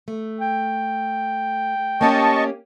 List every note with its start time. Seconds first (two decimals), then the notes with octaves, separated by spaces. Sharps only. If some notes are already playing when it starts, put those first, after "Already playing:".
0.08 A3
0.40 G5
2.01 A#3 C#4 G4 D#5 A5 C#6